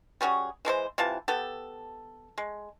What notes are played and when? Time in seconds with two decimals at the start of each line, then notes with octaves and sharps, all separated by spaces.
0.21 G3 C#4 F#4 G#4
0.65 E3 G#3 A4 C5
0.98 C3 E3 F4 A5
1.28 B3 G4 A4
2.38 G#3